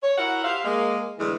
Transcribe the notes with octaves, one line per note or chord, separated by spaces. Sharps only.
C#5
E4 F#4 A#4 F#5
G4 C5 E5 F5
G#3 A#3
E2 A2 D3 E3 G#3